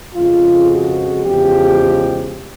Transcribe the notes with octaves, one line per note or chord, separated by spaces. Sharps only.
F2 C#3 F3 G#3 F4
F#4
E2 C#3 F3 G#3 G4